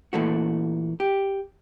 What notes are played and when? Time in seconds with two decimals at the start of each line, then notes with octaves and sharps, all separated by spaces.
0.13 A#2 E3 A3 F#4
1.00 G4